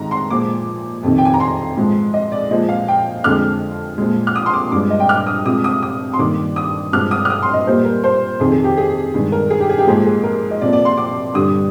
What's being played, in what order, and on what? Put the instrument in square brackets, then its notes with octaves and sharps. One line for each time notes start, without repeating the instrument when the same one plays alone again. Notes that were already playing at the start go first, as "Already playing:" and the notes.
Already playing: [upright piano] G#2 D#3 A#5
C6
A#2 F3 G#3 D6
F2 C3 D#3
G5
G#5
A#5
C6
G#2 F3 G#3
D#5
D5
A#2 F3 G#3 D#5
F5
G5
F2 D3 F3 G#3 F6
A#2 F3 G#3
F6
D#6
C6
D6
G2 F3 G#3 D6
D#5
G5
F6
D#6
C3 F3 G#3 D#6
D#6
D#6
C6
G2 D#3 A#3 D6
D#6
G2 F3 G#3 F6
D#6
F6
D#6
C6
D#5
A#2 G3 A#3 C5
A#4
C5
F2 C3 D#3 G#4
G#4
G4
G#4
G2 D#3 G#3
A#4
G#4
G4
G#4
G4
G#2 F3 A#3 G#4
G#4
A#4
D#5
C3 F3 A#3 D5
D5
C6
D6
G2 D3 G3 D#6